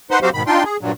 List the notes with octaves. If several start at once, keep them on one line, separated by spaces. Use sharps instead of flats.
D#4 B4 C5 F#5 C6
F#3 C4 F#4 G4 C5 F5
G#2 B2 D#3 B5
D4 D#4 F4 G5 C6
G#4
G2 A#2 F#3